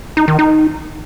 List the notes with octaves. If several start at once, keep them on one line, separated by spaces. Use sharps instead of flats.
D#4
D#3
D#4